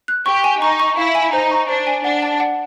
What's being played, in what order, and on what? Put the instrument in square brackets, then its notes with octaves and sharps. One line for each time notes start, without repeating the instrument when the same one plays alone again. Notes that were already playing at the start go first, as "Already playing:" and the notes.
[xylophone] F#6
[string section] G4 [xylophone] C#6
[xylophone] G#5
[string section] D#4 [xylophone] C#6
[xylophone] C#6
[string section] E4 [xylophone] F5
[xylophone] G#5
[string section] D#4 [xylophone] C5
[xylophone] C#6
[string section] D4 [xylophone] C5
[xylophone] G#5
[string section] D4 [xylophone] F#5
[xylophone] A5
F#5